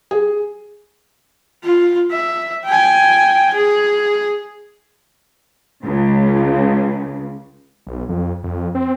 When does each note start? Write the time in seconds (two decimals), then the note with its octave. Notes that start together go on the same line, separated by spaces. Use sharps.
0.11 G#4
1.64 F4
2.11 E5
2.65 G5 G#5
3.54 G#4
5.82 C#2 C#3
7.87 B1
8.09 F2
8.44 F2
8.75 C4